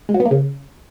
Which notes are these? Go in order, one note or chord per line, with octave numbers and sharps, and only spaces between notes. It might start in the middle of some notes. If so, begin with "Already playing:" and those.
G#3
F#3
B3
A#3
C#3